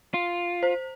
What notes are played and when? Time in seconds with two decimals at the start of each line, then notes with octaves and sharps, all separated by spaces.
0.14 F4
0.63 C5